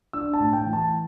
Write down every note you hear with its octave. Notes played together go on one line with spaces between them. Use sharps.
D4 E6
A5
A2
G5
E3
A5